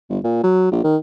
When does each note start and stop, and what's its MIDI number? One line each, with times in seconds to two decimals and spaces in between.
0.10 0.19 31
0.24 0.43 46
0.43 0.71 54
0.71 0.79 34
0.84 0.97 51